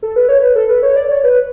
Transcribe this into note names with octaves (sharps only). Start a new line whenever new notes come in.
A4
B4
C#5
B4
A4
B4
C#5
D5
C#5
B4